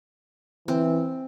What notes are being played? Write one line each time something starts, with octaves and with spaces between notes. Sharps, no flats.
E3 C4